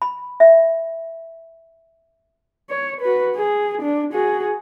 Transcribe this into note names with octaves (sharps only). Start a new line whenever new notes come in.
B5
E5
C#5
F#4 B4
G#4
D4
F#4 G#4